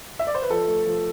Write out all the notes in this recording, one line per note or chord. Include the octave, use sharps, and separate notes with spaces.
E5
D5
C5
B4
F3 A4
A3
F3